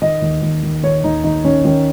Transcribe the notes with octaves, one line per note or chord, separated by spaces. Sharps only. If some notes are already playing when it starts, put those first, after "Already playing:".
D#3 D#5
D#2
D#2
D#3
D#3 C#5
D#2 D#4
D#2 D#4
D#3 C#4
D#3 C#4